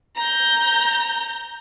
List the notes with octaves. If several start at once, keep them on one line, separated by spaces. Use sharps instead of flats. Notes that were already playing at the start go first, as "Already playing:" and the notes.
A#5 G6